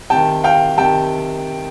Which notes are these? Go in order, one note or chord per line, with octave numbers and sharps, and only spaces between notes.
C3 D#3 G5 A5
F5 G5
C3 D#3 G5 A5